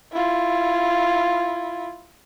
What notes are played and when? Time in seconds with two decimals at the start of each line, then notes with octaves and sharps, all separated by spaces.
0.13 E4 F4